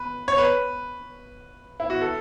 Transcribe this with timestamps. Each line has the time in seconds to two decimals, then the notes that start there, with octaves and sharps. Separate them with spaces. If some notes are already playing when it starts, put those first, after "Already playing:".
Already playing: B4
0.28 C#5
0.38 B4
1.80 E4
1.90 F#4
2.01 A4